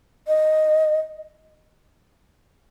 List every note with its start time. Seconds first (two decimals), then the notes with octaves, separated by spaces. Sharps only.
0.28 D#5